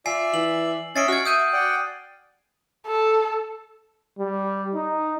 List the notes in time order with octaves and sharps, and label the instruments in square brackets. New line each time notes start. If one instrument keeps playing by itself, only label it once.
[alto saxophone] F4 [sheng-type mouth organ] D5 E5 [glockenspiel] G#5 C7
[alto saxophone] E3 [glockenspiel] F#7
[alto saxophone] C#4 [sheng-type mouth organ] D#5 E5 [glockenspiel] A6 C7 D7
[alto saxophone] F#4 [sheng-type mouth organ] C#6 [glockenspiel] F6 G#6
[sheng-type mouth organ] E5 [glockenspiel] D#6 G6 D#7
[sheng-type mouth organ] D5 F#5 G5
[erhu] A4
[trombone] G3
D#4